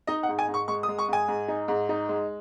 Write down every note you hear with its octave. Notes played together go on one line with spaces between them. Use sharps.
D#4 D#5
F#5
G#2
G#5
G#2
C#6
G#3 C#6
D#6
G#3
C#6
G#2 G#5
G#2
D#4
G#2
D#4
G#3